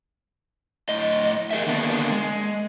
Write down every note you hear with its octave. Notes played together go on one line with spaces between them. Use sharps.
A2 D#5
G#4 A#4 E5
D3 D#3 A#3 B3 D4
G#3